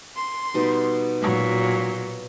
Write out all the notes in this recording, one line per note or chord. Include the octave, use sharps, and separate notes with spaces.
C6
B2 G3 D#4
A#2 F#3